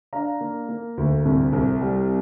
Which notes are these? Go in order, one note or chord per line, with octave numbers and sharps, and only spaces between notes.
D4 F5 A#5
A#3
A#3
D2
C2
C2
G3